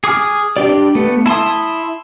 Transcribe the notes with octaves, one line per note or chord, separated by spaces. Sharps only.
G#4 D6 D#6 F6
D4 G4 D5
A3 B3
E4 A5 C6 D#6